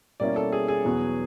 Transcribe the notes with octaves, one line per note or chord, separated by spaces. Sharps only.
B2 G3 A#3 C#4 E4 D5
A4
G#4
G#4
E2 B2 F#3 B3